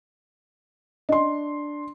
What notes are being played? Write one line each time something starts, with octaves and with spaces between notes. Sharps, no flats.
D4 D#5 C6